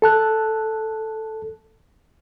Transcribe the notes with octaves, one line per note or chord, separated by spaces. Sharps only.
A4 A5 F#6